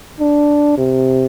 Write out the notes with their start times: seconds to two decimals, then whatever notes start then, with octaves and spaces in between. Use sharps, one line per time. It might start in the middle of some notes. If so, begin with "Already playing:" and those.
0.20 D4
0.77 C3